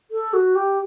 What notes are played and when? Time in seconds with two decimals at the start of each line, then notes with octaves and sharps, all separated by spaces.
0.11 A4
0.34 F#4
0.56 G4